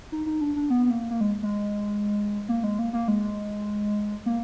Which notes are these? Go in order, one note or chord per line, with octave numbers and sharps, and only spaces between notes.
D#4
D#4
D4
D4
B3
B3
A#3
A#3
G#3
G#3
A#3
G#3
A#3
A#3
G#3
A#3